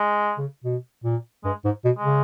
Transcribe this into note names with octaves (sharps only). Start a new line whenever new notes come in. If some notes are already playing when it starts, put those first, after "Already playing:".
Already playing: G#3
C#3
B2
A#2
G2 G#3
G#2
B2
G#3
C#3